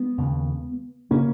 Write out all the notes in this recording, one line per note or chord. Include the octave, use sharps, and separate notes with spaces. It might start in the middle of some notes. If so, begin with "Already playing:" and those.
Already playing: G#3 B3
D#2 C#3
C#3 A#3 C#4